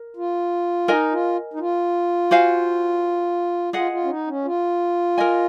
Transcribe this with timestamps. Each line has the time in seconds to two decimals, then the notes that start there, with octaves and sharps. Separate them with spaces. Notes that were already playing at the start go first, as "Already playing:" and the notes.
Already playing: A#4
0.17 F4
0.88 D#4 A#4 D#5 G#5
1.12 F4
1.54 D#4
1.60 F4
2.31 F#4 C5 F5 G#5
3.73 F4 G#4 D#5 F#5
3.92 F4
4.04 C#4
4.10 D#4
4.28 C#4
4.45 F4
5.18 A#4 D#5 G#5